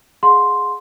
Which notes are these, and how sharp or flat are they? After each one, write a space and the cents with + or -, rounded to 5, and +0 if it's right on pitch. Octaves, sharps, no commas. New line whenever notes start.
G#4 +0 F#5 -45 C6 +0